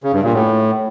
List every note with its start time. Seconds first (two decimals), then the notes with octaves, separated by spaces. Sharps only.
0.04 C#3
0.13 G2
0.23 A#2
0.33 A2